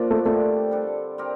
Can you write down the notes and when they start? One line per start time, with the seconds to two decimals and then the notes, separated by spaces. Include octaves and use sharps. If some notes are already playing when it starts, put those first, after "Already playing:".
Already playing: A#2 F3 A#3 D4
0.10 A3
0.25 D3 G3 A3 C4
0.71 G3 D4 A4
1.18 G3 C4 G4 A#4